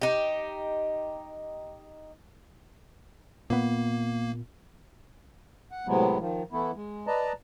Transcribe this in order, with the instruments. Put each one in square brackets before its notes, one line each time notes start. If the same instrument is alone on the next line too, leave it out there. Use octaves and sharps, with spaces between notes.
[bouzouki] D#4 G4
[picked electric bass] A#2 B3 [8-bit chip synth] A#3
[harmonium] F#5
A2 C3 F#3 G#3 B3
D#3 F3
E3 A3 B3 E4
G#3
B4 D5 D#5 A5 A#5